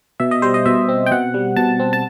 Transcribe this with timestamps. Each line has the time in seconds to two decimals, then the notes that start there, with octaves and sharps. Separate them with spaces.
0.20 B2 E5
0.31 D#5
0.42 G3 C5
0.54 D#5
0.66 B2 E5
0.89 C4
1.06 G5
1.11 B2 F#5
1.34 G3
1.56 B2 A5
1.80 C4
1.93 A5